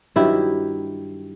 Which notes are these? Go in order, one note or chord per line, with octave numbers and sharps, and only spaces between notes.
G2 D#3 F#3 E4 G4